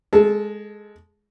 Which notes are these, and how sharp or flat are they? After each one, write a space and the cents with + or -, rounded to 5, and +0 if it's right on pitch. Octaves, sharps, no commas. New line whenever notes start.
G#3 +0 A4 -15 A5 -20